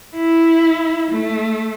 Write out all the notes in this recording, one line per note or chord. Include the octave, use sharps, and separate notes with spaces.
E4
A3